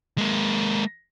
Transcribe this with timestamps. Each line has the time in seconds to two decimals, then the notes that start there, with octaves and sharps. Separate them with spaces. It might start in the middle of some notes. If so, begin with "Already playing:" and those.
0.18 G#3 A#3